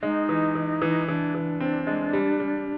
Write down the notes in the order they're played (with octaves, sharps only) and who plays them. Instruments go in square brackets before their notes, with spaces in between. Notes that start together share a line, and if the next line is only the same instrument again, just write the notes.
[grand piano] G#3 [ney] D#4
[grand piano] E3
E3
E3
[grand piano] E3 [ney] D4
[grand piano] E3
C4
G#3
G3
G3